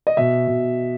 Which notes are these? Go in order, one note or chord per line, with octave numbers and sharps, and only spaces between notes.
D#5
B2 E5
B2